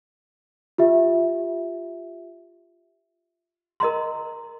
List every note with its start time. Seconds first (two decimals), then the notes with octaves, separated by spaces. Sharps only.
0.78 F4 G4 E5
3.80 A#4 D#5 A#5 C6